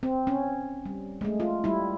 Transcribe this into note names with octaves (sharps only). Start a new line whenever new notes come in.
C4
C#4
G3
G#3 A3
F4
G3 E4